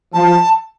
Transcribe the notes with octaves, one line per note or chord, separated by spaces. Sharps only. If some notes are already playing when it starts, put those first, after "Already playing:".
F3 A5